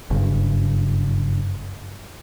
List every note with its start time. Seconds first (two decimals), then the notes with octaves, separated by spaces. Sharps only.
0.10 F#1 G2 C#3